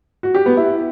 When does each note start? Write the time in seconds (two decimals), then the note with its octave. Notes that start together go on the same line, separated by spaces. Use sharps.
0.23 F#4
0.35 G4
0.46 B3
0.57 E4